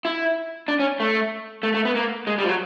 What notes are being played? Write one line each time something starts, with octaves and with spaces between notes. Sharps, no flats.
E4
D4
C#4
A3
A3
A3
B3
A#3
G#3
G3
F3
F#3